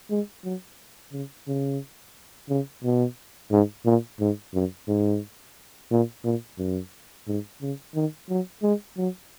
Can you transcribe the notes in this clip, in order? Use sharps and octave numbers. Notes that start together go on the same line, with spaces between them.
G#3
F#3
C#3
C#3
C#3
B2
G#2
A#2
G#2
F#2
G#2
A#2
A#2
F#2
G#2
C#3
D#3
F#3
G#3
F#3